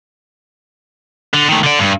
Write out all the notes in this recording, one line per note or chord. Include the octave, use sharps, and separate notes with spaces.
D3
D#3 A3
D3 D5
G2